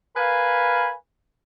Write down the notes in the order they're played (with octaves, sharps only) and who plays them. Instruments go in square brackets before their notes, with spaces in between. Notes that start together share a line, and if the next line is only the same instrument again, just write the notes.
[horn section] A#4 B4 F5 G#5 B5